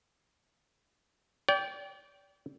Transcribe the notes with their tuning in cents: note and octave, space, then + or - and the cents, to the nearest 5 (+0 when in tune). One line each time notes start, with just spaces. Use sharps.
D5 -35 G5 +0